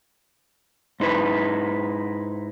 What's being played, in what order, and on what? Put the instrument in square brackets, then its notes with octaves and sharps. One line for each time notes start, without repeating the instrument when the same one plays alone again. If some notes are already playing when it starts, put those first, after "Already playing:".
[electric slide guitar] G#2 D#4 E4 B4